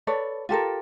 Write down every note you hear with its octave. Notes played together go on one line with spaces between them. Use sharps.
A4 B4 C#5 D5
F4 G4 A4 A#4